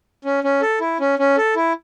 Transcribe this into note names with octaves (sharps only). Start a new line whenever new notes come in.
C#4
C#4
A4
E4
C#4
C#4
A4
E4